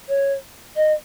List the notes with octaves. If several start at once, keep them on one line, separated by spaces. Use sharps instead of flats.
C#5
D#5